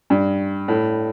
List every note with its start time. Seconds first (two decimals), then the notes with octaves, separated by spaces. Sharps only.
0.10 G2
0.68 A2